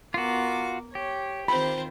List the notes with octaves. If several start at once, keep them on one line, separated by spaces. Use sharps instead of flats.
B3 F4 F#4 A#4 D6
G4 C#5
D#3 C4 F4 C5 B5